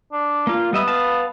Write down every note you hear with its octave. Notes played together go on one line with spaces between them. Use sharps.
D4
A#3 F4
G3 B3 D#5 E5
B4 F5 A5